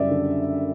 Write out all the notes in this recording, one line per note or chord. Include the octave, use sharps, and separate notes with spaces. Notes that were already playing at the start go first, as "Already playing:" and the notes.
Already playing: F#1 F#2 F#3 G3 D5 E5
D3